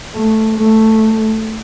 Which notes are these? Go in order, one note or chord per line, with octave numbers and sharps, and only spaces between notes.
A3
A3